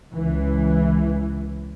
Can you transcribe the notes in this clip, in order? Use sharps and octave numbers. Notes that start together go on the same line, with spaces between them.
C#2 E3